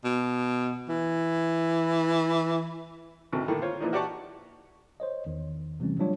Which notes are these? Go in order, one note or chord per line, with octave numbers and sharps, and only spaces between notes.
B2
E3
G#1 D2 C3
A2 D3 D#3
F4 C5 C#5
A#2 E3 F3 D4 D#4
F#4 G4 D5 F#5 A5 C#6
C5 C#5 D#5
E2 D#3
C3 E3 G3 A3 C4 C#4
F#3 G3 A3 D4 F4 C#5